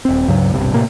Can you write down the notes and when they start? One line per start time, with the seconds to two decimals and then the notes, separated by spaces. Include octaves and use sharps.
0.05 D#1 C4
0.27 C#2 G2 C#3 F#3
0.54 D#1 B1 G2 C3
0.73 A2 C3 A#3